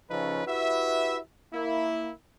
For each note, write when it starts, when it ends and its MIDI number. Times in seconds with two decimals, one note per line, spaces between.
0.10 0.42 49
0.10 0.42 53
0.10 0.42 61
0.10 0.42 63
0.10 0.42 69
0.10 0.42 71
0.47 1.19 64
0.47 1.19 66
0.47 1.19 67
0.47 1.19 71
0.47 1.19 76
1.54 2.10 58
1.54 2.10 64